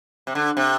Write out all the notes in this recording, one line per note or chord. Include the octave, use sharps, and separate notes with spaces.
C3
D3
C3